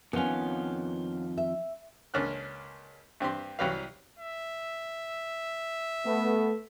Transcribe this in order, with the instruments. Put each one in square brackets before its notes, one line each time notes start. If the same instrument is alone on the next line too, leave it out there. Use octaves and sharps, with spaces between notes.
[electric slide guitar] F2 D#3 F4 [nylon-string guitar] B3 C#4
[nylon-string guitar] E5
[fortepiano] C#2 A#3 C#4 D4 F6 F#6
G2 C4 G4 C6
C2 F#3 C#4 G4 B4 F5
[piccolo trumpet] E5
[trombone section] A3 B3